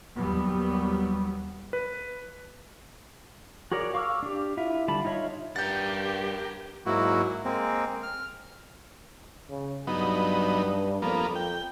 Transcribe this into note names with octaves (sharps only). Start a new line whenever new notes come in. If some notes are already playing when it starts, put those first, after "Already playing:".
D#2 F#3 G3 B3
B4
F#4 G#4 A#4 C#5 D5
F5 C#6 D6 E6 F6
D4 G4
E4 F4 E5
D3 G3 A5 B5
D#4 F4 C#5 E5
G2 G4 A#4 F#5 G6 A6
G#2 F#3 A#3 E4 F#4
G#3 A#3 C4
F6
C#3
G2 F#3 B3 D#4
F2 F3 A#3 B3
G5